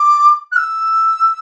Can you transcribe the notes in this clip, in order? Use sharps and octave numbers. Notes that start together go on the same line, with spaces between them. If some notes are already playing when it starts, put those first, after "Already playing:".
Already playing: D6
F#6
E6